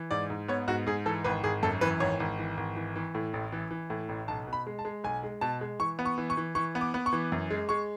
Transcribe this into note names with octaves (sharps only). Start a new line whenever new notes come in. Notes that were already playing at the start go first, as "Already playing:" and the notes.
Already playing: E3
G#2 D5
G#2
B3 C#5
G#2 F#4
G#2 G#4
E3 A4
G#1 B4
G#1 G#4
F#2 A4
E3 B4
G#1 C#5
G#1
E3
G#1
E3
E3
A2
A1
E3
E3
A2
A1
B1 A5
B2
B5
G#3
A5
G#3
B1 G#5
G#3
B2 A5
G#3
E3 C#6
B3
C#6
E3
C#6
E3
E3 C#6
B3
D6
B3
C#6
E3
F#2
G#3
G#3 C#6